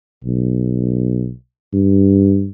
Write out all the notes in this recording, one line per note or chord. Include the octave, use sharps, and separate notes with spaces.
B1
G2